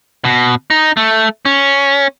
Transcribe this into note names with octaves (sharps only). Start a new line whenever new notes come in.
B2
D#4
A3
C#4